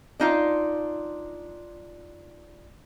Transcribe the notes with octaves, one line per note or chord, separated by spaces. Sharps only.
D4 D#4 F4